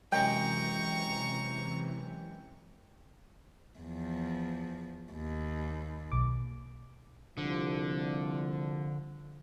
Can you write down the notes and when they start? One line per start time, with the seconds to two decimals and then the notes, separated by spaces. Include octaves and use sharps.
0.12 F#2 C3 E3 G#3 E5 G5 A#5 C#6
3.79 E2 F3
5.13 D#2
6.12 B1 D6
7.38 C2 D3 F3